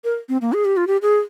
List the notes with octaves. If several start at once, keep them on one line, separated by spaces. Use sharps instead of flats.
A#4
C4
A#3
G#4
G4
F4
G4
G#4